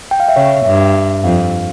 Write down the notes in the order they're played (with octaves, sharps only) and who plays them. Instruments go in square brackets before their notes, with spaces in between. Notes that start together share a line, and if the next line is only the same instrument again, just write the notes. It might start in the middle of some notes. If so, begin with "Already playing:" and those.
[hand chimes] G5
F5
E5
[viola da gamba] C#3 [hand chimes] C#5
[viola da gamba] G2 [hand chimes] E5
[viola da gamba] F2 [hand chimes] F5